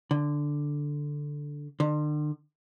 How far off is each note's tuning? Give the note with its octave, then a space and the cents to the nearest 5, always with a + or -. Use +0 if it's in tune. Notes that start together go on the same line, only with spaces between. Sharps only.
D3 +0
D3 +40